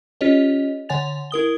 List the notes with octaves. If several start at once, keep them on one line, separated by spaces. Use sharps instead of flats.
C#4 F4 G4 C#5 D#5
D3 C#5 F#5 G#5 A6 F7
E4 A#4 D#6 G7